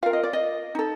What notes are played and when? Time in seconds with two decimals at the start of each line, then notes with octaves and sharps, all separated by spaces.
0.03 F4 A#4 F5
0.13 D#5
0.24 D5
0.33 D#5
0.75 D#4 A4